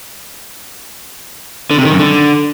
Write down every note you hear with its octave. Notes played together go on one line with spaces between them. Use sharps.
D3
C3
D#3
F#2
D3